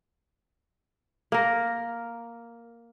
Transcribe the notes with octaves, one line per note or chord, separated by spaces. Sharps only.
A#3 A#4